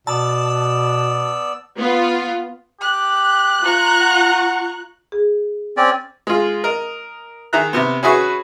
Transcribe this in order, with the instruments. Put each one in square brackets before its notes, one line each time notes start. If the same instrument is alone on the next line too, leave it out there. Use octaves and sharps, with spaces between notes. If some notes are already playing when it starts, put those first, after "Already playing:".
[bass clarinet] B2 [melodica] B3 D5 E6 [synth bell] A5
[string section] B3 F4
[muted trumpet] G4 [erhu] F#6
[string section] F4 A#5 C#6
[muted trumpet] F#5
[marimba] G#4
[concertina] C4 C#4 D5
[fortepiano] G#3 F4
A#4 D#5
D#3 G#4 E5 A#5 F#6
C3 B3
C#4 F#4 G#4 B4 E5 C#6